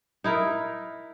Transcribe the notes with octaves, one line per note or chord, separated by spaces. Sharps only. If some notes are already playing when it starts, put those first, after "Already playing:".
D#4 E4 A#4